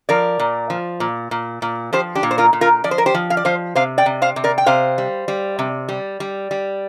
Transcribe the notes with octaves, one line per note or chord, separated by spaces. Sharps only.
F3 A#4 D5
A#2
F3
A#2
A#2
A#2
F3 G4 C5
D4 G4
A#2
C5
F4 A#4
A#2
F4 A#4
F3 D5
C5
A#4
G4 C5
F3
F5
D5
F3 C5 F5
C3 C5 F5
D5 G5
C3
C5 F5
C3
A#4 D5
G5
C3 C5 F5
G3
G3
C3
G3
G3
G3